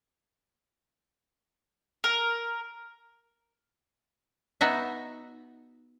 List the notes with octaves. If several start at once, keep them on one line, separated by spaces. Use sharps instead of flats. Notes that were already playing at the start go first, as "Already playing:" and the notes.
A#4
B3 D#4 F#4 E5